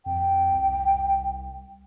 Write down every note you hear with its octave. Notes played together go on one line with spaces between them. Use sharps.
F2 G5
C2